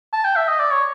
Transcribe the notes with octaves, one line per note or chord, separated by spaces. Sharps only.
A5
G5
E5
D#5
D5
C#5